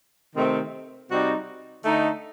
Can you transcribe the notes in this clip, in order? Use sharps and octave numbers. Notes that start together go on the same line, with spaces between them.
C3 D#3 A3 C4
C3 G3 C4 D#4 F#4
D3 A3 D#4